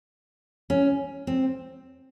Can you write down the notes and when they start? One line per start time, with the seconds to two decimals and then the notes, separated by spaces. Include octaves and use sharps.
0.70 C#4
1.27 C4